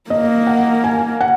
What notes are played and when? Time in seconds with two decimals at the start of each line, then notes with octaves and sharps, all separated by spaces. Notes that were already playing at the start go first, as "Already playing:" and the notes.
0.10 A#3 D#5
0.47 F#5
0.84 G#5
1.21 F#5